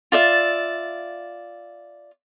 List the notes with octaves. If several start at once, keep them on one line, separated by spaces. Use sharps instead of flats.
F4 D5 E5